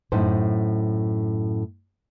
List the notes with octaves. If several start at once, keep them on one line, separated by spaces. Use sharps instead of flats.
F#2 A2 D#4 C5